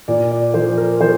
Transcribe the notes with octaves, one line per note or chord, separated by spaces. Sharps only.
A#2 D5
D5
F3 C5
A#4
F3 C5